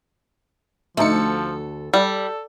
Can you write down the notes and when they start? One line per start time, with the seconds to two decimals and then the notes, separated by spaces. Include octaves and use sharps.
0.97 D2 F3 A3 D#4 A4 C#7
1.94 G3 A4